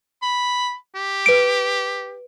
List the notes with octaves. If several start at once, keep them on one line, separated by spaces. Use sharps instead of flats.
B5
G4
B4 D7